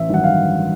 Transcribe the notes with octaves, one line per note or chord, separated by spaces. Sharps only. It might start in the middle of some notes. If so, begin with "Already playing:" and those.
Already playing: A1 E5
G2 D#3 F#3 F#5
F5